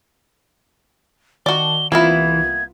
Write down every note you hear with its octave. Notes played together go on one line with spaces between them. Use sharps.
D#3 F#4 D5 A5 G7
C2 E3 A#3 B3 E4 F4 G#6